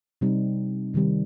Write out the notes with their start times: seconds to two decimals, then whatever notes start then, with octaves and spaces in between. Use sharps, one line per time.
0.21 C3 G3 C4 D#4
0.94 C3 D#3 G3 C4